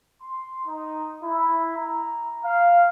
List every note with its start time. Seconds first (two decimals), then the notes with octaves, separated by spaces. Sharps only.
0.22 C6
0.66 D#4
1.23 E4
1.76 A#5
2.44 F5